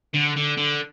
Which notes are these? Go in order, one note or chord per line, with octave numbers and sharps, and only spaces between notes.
D3
D3
D3